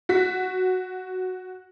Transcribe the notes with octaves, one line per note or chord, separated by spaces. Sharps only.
F#4 B6